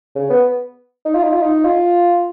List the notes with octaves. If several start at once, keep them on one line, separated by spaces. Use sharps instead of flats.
C#3
B3
D#4
F4
D#4
F4
D#4
F4